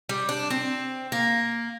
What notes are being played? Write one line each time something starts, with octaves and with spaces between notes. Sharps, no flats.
G3
D4
C4
A#3